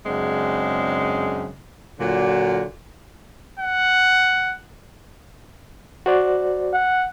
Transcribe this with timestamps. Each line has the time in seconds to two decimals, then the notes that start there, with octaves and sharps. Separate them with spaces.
0.06 F#2 C#3 G#3 C4 D4
1.99 A#2 D3 F#3 F4 F#4
3.60 F#5
6.06 F#4 C5 D5
6.73 F#5